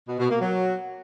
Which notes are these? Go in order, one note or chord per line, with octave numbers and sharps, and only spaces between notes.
B2
B2
A#3
F#3